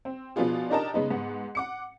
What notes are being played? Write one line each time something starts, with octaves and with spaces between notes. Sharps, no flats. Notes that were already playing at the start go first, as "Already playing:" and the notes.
C4
B2 F3 B3 D4 F4 G#4
D4 D#4 G4 A#4 D#5 A5
C#3 G#3 B3 D#4
G#2 B3 F#5
F#5 D6 C#7